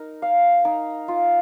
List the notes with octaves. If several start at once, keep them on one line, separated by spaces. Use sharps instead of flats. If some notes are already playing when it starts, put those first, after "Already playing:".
Already playing: D#4 A#4
F5
D#4
F4